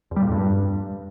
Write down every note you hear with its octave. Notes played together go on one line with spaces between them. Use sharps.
E2
G3
A#2
F2
G2